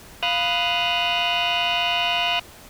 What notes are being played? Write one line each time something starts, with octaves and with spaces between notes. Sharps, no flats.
F5 B5 D#6 F6 F#6